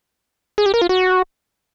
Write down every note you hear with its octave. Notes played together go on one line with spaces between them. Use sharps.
G#4
G4
A#4
F4
F#4